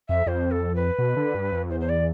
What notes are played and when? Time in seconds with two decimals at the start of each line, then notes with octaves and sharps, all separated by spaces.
0.08 F2 E5
0.26 F2 C5
0.51 A4
0.75 B4
0.98 B2
1.17 D3
1.35 G2
1.52 F2
1.70 E2 C5
1.80 C5
1.89 D5